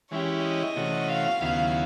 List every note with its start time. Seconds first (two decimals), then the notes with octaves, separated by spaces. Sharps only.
0.10 E3 G#3 C#4 E4 G4 C#5
0.44 D#5
0.76 C3 E3 A3 C#4 F#4
1.08 F5
1.41 D#2 C#3 F#3 B3 E4 F5